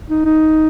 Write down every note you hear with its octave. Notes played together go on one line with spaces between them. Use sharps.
D#4
D#4